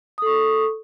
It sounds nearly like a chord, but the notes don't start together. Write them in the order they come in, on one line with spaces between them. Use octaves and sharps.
D#6 A4 C#6